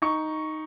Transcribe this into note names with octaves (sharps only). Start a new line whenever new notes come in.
D#4 C#6